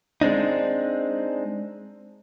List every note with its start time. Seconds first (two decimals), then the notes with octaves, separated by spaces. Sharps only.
0.21 G#3 C4 D4 D#4